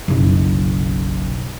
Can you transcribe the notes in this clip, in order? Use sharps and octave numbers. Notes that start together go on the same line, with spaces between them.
F#1 B1